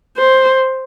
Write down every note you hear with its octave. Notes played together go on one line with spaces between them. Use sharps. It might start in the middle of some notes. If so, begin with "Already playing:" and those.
C5